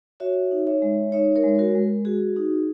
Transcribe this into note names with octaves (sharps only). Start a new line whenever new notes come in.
F#4 C#5 E5
D#4
C#5 E5
G#3
D#4 C#5 E5
A#4 C#5
G#3
F#4 A#4
G#3
F#4 G#4
D#4